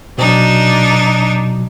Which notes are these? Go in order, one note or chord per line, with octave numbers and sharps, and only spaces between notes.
B2 F#3 D4 D#4